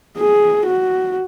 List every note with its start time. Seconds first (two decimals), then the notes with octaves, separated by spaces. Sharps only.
0.17 G#4
0.66 F#4